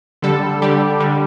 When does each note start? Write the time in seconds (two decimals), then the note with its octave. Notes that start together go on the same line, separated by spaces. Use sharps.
0.22 D3 G3 A4
0.62 D3 G3 G4
1.00 D3 G3